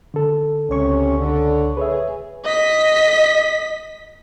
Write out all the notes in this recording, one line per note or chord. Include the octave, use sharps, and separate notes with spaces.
D3 A4
C#2 C3 C#4 C#5 C#6
D3
G#4 B4 C#5 E5
D#5 B6